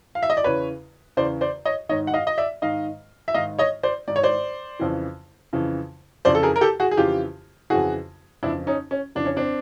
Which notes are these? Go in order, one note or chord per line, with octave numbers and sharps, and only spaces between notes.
F5
E5
D#5
D5
E2 C#3 E3 B4 C#5
E2 C#3 E3 C5 D5
C5 D5
C#5 D#5
G#2 D#3 C#5 D#5
F#5
D#5 F5
D#5
D5 E5
G#2 D#3 D#5 F5
E5
G#2 D#3 D#5 F5
C#5 D#5
C5 D5
G#2 D#3 D5
C#5
C5 D5
F2 C#3 E3
F2 C#3 E3
F2 C#3 E3 C5 D5
A4
G#4 A#4
A#4
G4 A4
F#4 G#4
G#4
F2 C#3 E3 F4 G4
F2 C#3 E3 F#4 G#4
F2 C#3 E3 D4 E4
C#4 D#4
C#4
F2 C#3 E3 D4
C#4
C4 D4